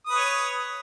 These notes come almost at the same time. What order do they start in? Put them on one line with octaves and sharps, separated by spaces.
D#6 B4 C#5